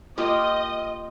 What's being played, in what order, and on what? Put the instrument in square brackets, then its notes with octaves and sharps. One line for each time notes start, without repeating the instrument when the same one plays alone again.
[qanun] A#3 F4 G4 [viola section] D#5